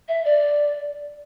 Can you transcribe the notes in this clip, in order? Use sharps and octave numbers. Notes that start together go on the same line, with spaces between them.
E5
D5